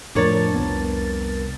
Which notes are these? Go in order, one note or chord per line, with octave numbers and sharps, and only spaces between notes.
F2 A2 F3 D4 A#4 C#5 A6
C2 B3